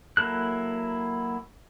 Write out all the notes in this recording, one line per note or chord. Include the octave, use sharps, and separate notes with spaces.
F#3 A#3 E4 A4 F#6